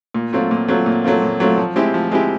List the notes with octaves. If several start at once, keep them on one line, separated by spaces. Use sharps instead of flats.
A#2
F#3 A3 C4 F4
A#2
F#3 A3 C4 F4
A#2
F#3 A3 C4 F4
A#2
F#3 A3 C4 F4
F3
G#3 C4 E4 G4
F3
G#3 C4 E4 G4